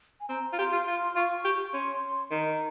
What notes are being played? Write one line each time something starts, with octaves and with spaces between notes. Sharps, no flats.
G#5
C4 A#5
F4
G4 C6
F4
F4
F4 C#6
G4
C#4 C6
D#3 A#5